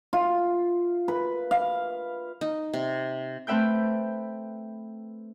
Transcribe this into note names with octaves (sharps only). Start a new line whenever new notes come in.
F4
B4
F5
D#4
C3
A3 C4 B4 E5 G5 G6